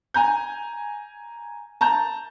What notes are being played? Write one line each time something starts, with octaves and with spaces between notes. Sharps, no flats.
G#5 A#5 G6
A5 A#5 G6